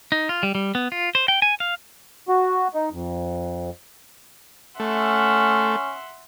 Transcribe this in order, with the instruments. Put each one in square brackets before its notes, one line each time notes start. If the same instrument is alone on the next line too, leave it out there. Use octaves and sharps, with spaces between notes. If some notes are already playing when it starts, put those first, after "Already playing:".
[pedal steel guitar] D#4
F4
G3
G3
B3
F4
C5
G5
G#5
F5
[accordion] F#4
D#4
F2
[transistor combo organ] A3 [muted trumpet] C#4 [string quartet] E5 F#5 C6